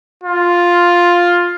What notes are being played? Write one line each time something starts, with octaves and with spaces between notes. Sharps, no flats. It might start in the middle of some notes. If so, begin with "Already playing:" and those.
F4